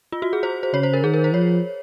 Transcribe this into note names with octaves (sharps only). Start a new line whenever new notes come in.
F4
F#4
G#4
C5
C5
C#3 C#5
C5
A#4
D#3 G#4
A#4
C5
F3 C#5